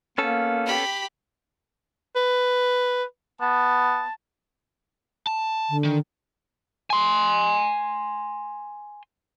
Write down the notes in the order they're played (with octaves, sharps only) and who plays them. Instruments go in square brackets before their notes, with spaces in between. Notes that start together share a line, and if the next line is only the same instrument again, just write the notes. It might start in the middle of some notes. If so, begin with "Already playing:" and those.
[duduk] A#3 [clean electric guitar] B3 C#4 A4
[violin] G4 B5
[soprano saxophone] B4
[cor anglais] B3 [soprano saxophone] A5
[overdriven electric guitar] A5
[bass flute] D3
[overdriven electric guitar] D#3
[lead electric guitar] G#5 C6